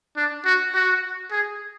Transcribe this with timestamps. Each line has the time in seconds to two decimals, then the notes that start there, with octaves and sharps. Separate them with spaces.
0.17 D4
0.45 F#4
0.74 F#4
1.31 G#4